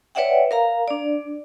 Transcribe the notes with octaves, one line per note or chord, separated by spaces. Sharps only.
B4 C#5 D5 E5 F#5 G5
A#4 F5 A#5
D4 D5